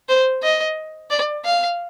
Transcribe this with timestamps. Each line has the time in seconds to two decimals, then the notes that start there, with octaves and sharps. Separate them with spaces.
0.09 C5
0.43 D#5
1.10 D5
1.45 F5